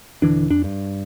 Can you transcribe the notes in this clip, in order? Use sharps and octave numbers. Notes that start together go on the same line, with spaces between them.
D#1 D3 E3 D4
F2 D4
G2